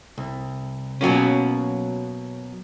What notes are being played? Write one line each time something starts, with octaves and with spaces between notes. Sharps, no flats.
C2
B2 F#3 A#3 C#4